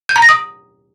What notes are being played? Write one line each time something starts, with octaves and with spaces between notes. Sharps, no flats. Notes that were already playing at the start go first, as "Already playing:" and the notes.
G6
A#5
A#6
D#6